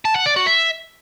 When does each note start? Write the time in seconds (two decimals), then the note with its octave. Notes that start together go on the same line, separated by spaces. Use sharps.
0.05 A5
0.16 F#5
0.26 D5
0.36 F#4
0.46 E5